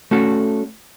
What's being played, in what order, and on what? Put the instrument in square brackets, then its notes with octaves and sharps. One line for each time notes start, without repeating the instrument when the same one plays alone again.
[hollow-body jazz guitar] A3 C#4 F#4 A4